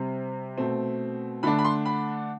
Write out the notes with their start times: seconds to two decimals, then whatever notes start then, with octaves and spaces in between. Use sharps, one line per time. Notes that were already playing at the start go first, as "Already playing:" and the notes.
Already playing: C3 G3 C4
0.58 B2 A3 C4
1.43 D3 A3 D4 B5
1.59 B5
1.64 C6
1.85 B5